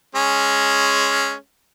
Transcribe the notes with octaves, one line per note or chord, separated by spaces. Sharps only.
G#3 C#4